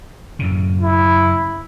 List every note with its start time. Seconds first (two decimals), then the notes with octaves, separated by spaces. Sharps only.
0.39 F#2 A2 C#3
0.82 E4